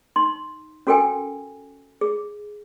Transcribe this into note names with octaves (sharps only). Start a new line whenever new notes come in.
D#4 C6
C#4 F#4 A4 A#4 G5 G#5
G#4